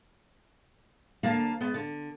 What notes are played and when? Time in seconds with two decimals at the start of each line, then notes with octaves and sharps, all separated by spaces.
1.23 D2 D3 A#3 F5 A5
1.61 G#3 B3
1.74 D3